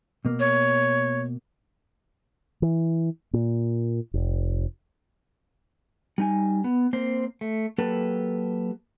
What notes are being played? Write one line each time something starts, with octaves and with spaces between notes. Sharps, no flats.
B2 A#3
C#5
E3
A#2
F1
G3 D#4 G#5
B3
A#3 C4 C5
A3
F#3 A#3 G4 A4 B4